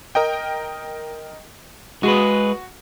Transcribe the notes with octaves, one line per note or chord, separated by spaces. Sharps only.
A#4 D#5 G5
G#3 F#4 G#4 B4